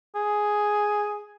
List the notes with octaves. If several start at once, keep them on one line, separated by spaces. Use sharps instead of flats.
G#4